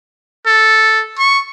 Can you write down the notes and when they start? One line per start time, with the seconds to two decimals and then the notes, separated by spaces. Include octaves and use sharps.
0.47 A4
1.18 C#6